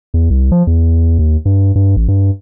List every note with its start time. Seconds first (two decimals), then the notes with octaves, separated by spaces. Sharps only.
0.14 E2
0.30 C2
0.52 F3
0.67 E2
1.19 D#2
1.45 G2
1.75 G2
1.96 A1
2.08 G2